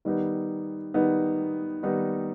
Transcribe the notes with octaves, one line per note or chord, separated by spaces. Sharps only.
D#3 G3 B3 D#4
D#3 G3 B3 D#4
D#3 G3 B3 D#4